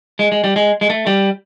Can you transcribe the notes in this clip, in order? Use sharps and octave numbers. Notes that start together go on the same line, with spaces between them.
G#3
G#3
G3
G#3
G#3
A3
G3